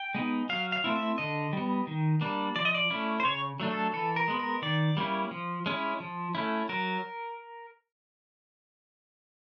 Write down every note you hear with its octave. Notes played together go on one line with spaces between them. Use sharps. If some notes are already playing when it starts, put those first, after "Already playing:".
Already playing: G5
G#3 B3 D#4
F#3 F5
F5
A3 C4 E4
E5
D3 D#5
G3 B3
D#3
G3 A#3 D4
F3 D5
D#5
D5
A3 C#4 E4
C5
C#3 C#5
F#3 A3 D4
A4
E3 A4
A#4
G#3 B3
A#4
D#3 D5
G3 A#3 C#4 E4
F3
G#3 C#4 E4
F3
A3 C#4 E4
F#3 A#4